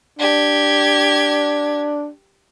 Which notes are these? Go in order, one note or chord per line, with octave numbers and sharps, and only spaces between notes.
D4 G4 G#6